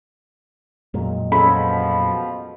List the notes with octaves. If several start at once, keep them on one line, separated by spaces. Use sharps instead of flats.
F2 A#2 F#3 G#3
B2 F3 C#4 G#4 A4 B5